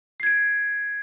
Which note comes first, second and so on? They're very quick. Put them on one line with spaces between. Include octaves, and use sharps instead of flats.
C7 G#6 D7